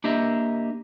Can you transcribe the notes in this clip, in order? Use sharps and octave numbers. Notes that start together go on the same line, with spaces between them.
A#3 D4 G4 D#5 E5